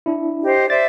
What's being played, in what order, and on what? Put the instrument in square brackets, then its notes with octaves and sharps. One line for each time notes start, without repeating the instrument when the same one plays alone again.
[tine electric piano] D4 E4
[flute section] G4 C5 D#5
[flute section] C5 D5 E5 [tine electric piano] A6